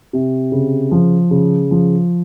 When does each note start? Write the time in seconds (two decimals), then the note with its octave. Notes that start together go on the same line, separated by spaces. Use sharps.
0.13 C3
0.52 C#3
0.91 F3
1.31 C#3
1.71 F3